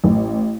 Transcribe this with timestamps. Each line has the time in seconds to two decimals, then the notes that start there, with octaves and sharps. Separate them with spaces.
0.04 A1